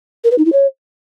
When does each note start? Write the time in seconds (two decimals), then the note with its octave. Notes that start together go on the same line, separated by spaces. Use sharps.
0.24 A#4
0.31 B4
0.38 D#4
0.45 E4
0.52 C#5